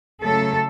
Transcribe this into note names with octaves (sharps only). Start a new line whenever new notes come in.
C#3 F#3 A3 A4